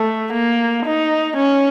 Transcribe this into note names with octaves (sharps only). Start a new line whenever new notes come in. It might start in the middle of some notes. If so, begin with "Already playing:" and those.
Already playing: A3
A#3
D#4
C#4